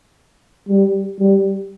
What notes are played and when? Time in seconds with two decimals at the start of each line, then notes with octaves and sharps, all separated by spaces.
0.69 G3
1.20 G3